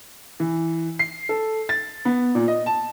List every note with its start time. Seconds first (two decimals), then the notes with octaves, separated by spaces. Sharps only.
0.40 E3
0.99 C7
1.29 A4
1.69 A6
2.05 B3
2.35 A#2
2.48 D#5
2.66 A5